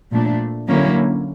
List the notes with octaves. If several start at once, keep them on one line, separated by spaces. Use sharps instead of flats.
A#2 F3 A3 D4
D3 F#3 A#3 C#4 E4